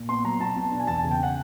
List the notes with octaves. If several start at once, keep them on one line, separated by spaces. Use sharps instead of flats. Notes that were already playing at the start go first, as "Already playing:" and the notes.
Already playing: A#2
B3 C6
F#3 A#5
B2 A5
B2
D4
G#5
E2 A5
G#5
C#3
G5
F#5